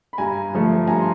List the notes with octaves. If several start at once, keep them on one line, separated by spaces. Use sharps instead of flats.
B5
G2 G#5 A#5
D3 F3 A3
G2 G#5 A#5
C6